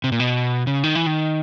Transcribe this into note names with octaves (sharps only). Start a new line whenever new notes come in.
C3
A#2
B2
C#3
D#3
E3
D#3